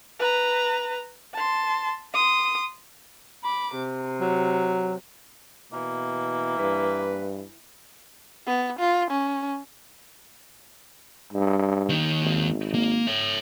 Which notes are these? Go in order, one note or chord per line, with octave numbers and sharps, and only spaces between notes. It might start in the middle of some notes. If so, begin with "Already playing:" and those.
B4 A#5
A5 C6
C6 D#6
B5 D6
C3
F#3
B2 E3 A#3
G2 B4
B3
F4
C#4
G2
D#2 D#3
G#1
A#3
C#5 E5